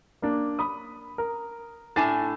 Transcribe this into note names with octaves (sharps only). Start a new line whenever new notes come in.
A#3 D4
B5 D#6
A#4
A2 D4 G#5 A6